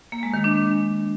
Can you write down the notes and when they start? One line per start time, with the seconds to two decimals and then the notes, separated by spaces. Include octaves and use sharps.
0.12 A#3
0.23 G#3
0.34 D#3
0.44 D4